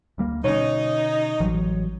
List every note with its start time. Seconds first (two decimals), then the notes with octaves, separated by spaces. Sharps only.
0.18 D2 G3 A#3
0.44 B2 D3 C#4 D#4 C#5
1.40 A1 E3 F#3 G3